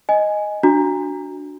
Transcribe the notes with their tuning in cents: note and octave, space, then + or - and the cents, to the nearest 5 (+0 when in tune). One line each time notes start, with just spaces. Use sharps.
D#5 +0 G#5 +0
D4 +0 F#4 -10 A#5 -5